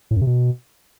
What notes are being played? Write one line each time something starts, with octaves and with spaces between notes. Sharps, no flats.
A2
F#2
C3
B2